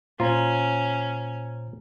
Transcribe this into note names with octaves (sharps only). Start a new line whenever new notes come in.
A#2 C#4 F4 C5 A#5